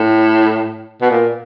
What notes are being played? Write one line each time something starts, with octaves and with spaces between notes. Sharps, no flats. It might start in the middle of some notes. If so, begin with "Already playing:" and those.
Already playing: A2
B2
A#2